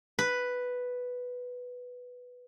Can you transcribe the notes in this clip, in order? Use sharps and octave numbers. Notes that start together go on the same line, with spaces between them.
B4